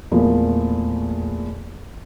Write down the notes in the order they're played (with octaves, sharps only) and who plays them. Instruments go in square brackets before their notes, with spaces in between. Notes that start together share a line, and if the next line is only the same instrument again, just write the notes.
[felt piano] E2 A#2 F3 A3 A#3